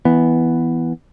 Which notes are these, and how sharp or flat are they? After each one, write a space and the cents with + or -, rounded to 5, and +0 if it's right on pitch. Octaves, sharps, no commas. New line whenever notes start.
E3 +0 B3 +0